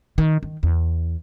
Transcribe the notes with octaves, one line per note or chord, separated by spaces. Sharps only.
D#3
D#3
E2